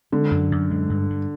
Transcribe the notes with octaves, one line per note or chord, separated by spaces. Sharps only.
D3 G#3
F#2
F#2
G#3
G2
G2